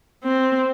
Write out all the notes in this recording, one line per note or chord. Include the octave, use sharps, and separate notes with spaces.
C4